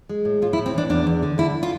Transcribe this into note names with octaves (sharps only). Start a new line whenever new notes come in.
G#3
A2
A2 F4
E4
A2
C4
E3 D4
E2 D4
E2
D3
D3 E4
F4